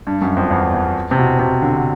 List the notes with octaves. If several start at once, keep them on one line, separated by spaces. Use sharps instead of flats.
G2
F#2
F2
E2
E2
C3
B2
C3
D3